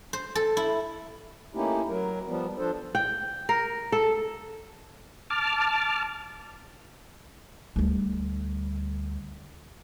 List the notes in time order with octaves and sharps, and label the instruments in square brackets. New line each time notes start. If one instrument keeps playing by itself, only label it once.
[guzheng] C5
A4
E4
[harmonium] A3 A#3 C#4 D#4 E4 G4
F#3 A#4
F3 G3 B3
F3 D4 A4 C5
[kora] G5
A#4
A4
[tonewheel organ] A5 D6 F6
[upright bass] D2 G3